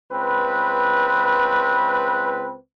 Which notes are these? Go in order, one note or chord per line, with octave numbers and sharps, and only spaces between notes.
C#2 C4 B4